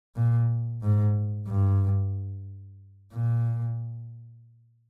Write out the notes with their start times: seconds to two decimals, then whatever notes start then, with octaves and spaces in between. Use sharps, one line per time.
0.16 A#2
0.82 G#2
1.48 G2
3.13 A#2